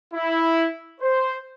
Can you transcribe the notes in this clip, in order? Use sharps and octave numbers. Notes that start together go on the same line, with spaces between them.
E4
C5